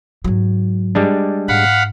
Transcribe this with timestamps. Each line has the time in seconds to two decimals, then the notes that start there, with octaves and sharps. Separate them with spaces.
0.24 G#2 F#3
0.95 G3 G#3 D4
1.48 G#2 F5 F#5 B5